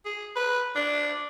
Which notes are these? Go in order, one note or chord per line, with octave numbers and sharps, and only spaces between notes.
G#4
B4
D4